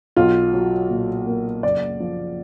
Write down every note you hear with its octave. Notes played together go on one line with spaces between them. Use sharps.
B1 F4
F#3
A#2
A#3
F#1 D5
F3